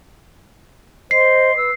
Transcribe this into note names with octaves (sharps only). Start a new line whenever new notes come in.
C5 D#5 C6 C7
B4 E6